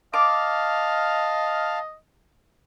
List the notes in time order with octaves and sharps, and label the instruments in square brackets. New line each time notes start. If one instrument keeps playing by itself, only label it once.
[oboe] D#5 [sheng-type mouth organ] F5 A5 F6 [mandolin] D6